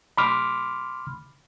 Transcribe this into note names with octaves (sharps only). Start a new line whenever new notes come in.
B5 C6 D6 F6